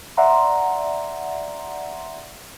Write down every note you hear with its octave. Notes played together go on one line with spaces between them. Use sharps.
D5 E5 F#5 A#5 C6